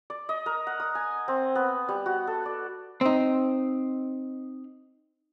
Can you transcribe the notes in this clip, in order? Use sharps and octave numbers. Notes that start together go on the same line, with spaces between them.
D5
D#5
A#4
F#5
D#6
G#5
C4
B3
G3
F#4
A4
D5
C4 D#4